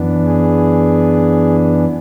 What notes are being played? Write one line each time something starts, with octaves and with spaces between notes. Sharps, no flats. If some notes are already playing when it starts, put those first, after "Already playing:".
Already playing: F#2 E3 B3 D4
G#4